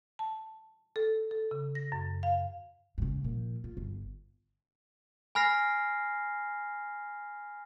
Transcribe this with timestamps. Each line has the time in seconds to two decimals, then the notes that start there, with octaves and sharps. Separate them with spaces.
0.19 A5
0.96 A4
1.31 A4
1.51 C#3
1.75 A#6
1.92 F#2
2.23 F5
2.98 G#2 C#3
3.24 A#2 F3
3.64 F4
3.77 G1
5.35 G#5 B5 F6 A#6 C7